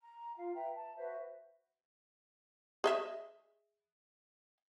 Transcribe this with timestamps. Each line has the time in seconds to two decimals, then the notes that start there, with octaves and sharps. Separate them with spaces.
0.01 A#5
0.35 F4 F5
0.54 B4 E5 G5 A#5
0.74 A5
0.96 F#4 B4 C5 E5
2.84 G#4 D#5 E5